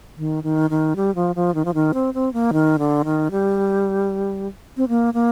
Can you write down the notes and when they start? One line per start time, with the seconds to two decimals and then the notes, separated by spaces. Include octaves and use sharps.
0.17 D#3
0.44 D#3
0.70 D#3
0.96 G3
1.15 F3
1.36 F3
1.55 D#3
1.65 F3
1.74 D#3
1.94 C4
2.14 C4
2.33 A#3
2.53 D#3
2.79 D3
3.05 D#3
3.31 G3
4.77 C4
4.89 A#3
5.14 A#3